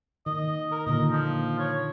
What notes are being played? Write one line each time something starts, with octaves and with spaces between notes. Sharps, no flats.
D#3 D#5
A#4
A#2 D3 D#3 D#5
F3
C#5